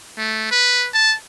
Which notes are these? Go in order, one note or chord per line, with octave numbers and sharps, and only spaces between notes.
A3
B4
A5